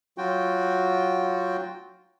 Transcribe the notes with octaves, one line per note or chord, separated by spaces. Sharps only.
F#3 F4 F#4 G5